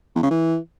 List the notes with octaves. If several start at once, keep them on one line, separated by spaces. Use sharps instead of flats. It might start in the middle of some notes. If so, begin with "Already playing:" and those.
E2
C#3
E3